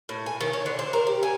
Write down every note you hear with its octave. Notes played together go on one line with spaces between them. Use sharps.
A2
G#5
D#3
C#5
D3
C5
A#4
G4
G#5